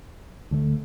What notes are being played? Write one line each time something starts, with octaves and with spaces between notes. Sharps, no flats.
D2 D3 A3